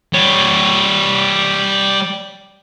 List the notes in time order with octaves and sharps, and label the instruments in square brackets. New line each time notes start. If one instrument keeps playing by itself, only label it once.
[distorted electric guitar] G3 C#5